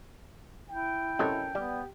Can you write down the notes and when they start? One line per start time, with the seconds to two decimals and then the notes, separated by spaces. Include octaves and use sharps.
0.69 E4 G5
1.19 C3 F#3 C#4 A4 A#4 D#5
1.55 G3 B3 G4